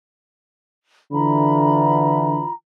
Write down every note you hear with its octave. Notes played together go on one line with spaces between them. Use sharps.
D3 E3 F4 A#5 B5